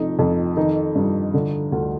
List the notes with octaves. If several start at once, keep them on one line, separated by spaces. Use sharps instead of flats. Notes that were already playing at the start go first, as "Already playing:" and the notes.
Already playing: F1 F2 D#4
F2
D#3 D#4
G2
D3
D2